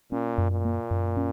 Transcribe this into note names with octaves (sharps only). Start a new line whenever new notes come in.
A#2 C#4
F#2
A#2
A#3
F#2
C#4